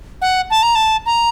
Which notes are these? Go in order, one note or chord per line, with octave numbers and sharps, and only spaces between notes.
F#5
A5
A#5
A5
A#5